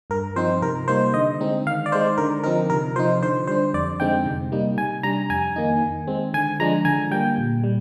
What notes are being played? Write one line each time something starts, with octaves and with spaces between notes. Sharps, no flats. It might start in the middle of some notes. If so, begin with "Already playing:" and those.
G2 A#4
F3 C4 D#4 C5
C3 A#4
G3 A#3 D#4 C5
D3 D#5
G#3 C4 D#4
D#3 F5
D5
G#3 D#4 C5
D3 A#4
F3 C4 D#4 A#4
C3 A#4
F3 C4 D#4 C5
D3 C5
G3 D4 C5
F2 D5
D3 G#3 C4 D#4 G5
C3
G3 A#3 D#4
C3 G#5
G3 D4 A#5
F2 G#5
D#3 A#3 D#4
D#3
G#3 C4
D3 G#5
F3 G#3 D4 A#5
D3 G#5
G3 A#3 G5
A#2
G3